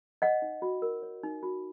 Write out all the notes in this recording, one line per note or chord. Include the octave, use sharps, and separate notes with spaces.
C#5 D#5 F#5
D#4
F#4
A#4
C#5
D#4
F#4